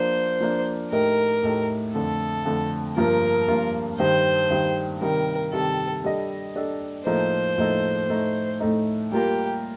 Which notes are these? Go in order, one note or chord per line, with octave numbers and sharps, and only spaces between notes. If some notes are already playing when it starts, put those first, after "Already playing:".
Already playing: F3 A#3 D4 C5
F3 A#3 D4
A2 A3 D#4 G4 A#4
A2 A3 D#4 G4
F2 D3 A3 A4
F2 D3 A3
G2 F3 A#3 F4 A#4
G2 F3 A#3 F4
G2 D#3 G3 C5
G2 D#3 G3
C3 D#3 G3 A#4
C3 D#3 G3 A4
G3 D4 A4 D#5
G3 D4 A4 D#5
A2 F3 A#3 D#4 A4 C5
A2 F3 A#3 D#4 A4
A2 A3 D#4
A2 A3 D#4
G3 A#3 F4 G4 A#4